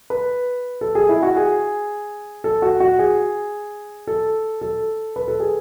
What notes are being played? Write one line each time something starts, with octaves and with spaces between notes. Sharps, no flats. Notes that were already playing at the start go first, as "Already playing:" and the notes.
B4
A4
G#4
E4
F#4
G#4
A4
F#4
F#4
G#4
A4
A4
B4
A4
G#4